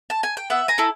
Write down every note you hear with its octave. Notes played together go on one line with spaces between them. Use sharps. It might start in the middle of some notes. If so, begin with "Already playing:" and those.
A5
G#5
G5
B3 E5 F#5
G#5 A#5
E4 A4